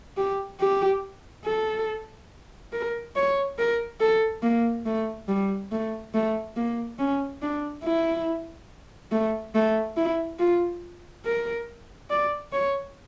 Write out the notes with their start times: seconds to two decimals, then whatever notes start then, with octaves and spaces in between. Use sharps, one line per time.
0.17 G4
0.60 G4
1.45 A4
2.73 A#4
3.16 C#5
3.59 A#4
4.01 A4
4.43 A#3
4.86 A3
5.29 G3
5.71 A3
6.14 A3
6.57 A#3
6.99 C#4
7.42 D4
7.84 E4
9.12 A3
9.55 A3
9.97 E4
10.39 F4
11.25 A#4
12.10 D5
12.53 C#5